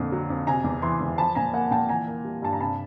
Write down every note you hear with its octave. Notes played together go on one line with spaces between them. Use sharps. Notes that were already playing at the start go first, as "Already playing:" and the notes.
Already playing: F2 A#2 D3
F#3
F2
C3 G#5 A#5
E2
E3 A#5 C6
E2
F3 A5 B5
A#2 G#5 A#5
A#3 F#5 G#5
A#2 G5 A5
E3 G#5 A#5
A#3
G3
G2 A5
A#5
C3 A5 B5